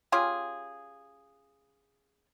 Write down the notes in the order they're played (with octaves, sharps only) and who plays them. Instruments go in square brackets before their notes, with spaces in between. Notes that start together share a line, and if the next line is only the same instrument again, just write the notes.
[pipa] C#4 F4 G4 G#4